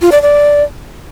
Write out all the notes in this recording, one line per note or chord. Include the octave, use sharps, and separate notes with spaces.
F4
D5
D5